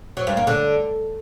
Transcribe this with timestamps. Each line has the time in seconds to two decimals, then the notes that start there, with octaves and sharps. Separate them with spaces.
0.17 F#3
0.27 G2
0.37 A#3
0.47 D3